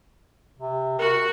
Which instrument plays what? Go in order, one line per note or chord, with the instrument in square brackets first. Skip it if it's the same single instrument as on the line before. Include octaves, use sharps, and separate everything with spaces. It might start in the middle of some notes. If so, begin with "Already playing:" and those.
[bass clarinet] C3
[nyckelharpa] F#4 F#5 [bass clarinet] A#4